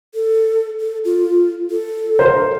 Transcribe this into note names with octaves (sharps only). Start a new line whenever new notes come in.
A4
A4
F4
A4
A#4 C5